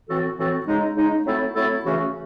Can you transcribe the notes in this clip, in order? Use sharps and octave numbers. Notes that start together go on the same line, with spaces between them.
A2 E3 C4 F#4 A4
A2 E3 C4 F#4 A4
C#3 G#3 D#4
C#3 G#3 D#4
F#3 A3 C4 E4 A4
F#3 A3 C4 E4 A4
C#3 E3 A3 C#4 F#4